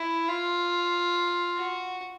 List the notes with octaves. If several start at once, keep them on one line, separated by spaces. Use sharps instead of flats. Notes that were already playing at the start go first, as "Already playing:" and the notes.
Already playing: E4
F4
F#4